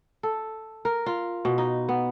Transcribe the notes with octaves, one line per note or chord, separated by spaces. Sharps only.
A4
A#4
F4
B2
D#4
B3